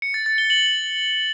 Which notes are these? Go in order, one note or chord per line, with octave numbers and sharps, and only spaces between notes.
C#7
A6
A6
G7
F#7